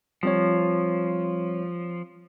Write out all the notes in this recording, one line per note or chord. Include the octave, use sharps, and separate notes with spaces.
F3 G3 C4 C#5